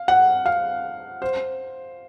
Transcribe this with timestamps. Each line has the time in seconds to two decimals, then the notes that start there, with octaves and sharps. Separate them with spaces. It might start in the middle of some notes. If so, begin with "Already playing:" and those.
Already playing: F5
0.08 F#5
0.46 F5
1.22 C5